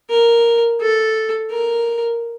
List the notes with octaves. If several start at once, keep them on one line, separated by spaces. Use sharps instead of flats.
A#4
A4
A#4